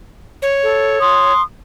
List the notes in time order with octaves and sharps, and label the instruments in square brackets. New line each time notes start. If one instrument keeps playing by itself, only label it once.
[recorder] C#5
[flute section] A4
C6 D#6